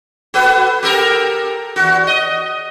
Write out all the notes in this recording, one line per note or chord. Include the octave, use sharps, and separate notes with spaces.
F#4 A4 B4
G4 A4 A#4
E2 F#4
D#5